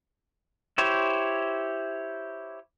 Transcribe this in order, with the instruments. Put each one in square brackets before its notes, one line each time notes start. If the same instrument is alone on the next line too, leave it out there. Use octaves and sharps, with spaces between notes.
[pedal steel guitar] E4 G4 C5 C#5